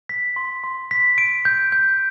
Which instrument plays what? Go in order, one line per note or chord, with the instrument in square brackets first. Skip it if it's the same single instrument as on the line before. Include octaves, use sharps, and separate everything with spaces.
[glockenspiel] B6
C6
C6
B6
D7
G6
G6